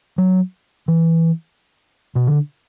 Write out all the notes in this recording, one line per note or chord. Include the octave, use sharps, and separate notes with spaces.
F#3
E3
B2
D3